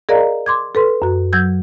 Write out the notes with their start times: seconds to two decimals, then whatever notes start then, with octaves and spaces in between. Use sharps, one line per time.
0.09 G#4 A#4 D5 D#5 F5 A#5
0.46 C6 D6 G#6
0.75 A4 B4 C6
1.02 F#2 F#4
1.33 F#3 E6 G6 G#6